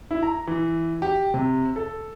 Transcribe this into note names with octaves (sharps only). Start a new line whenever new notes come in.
E4
A#5
E3
G4
C3
A4